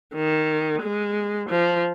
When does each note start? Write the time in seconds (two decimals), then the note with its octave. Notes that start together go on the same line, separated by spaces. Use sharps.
0.15 D#3
0.82 G#3
1.49 F3